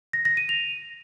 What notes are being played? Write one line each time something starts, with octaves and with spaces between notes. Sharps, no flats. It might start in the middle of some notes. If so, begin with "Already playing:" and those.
A#6
A#6
D#7
F7